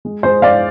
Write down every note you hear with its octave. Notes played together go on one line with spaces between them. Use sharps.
G#3
G#3 C5
G#3 D5 F5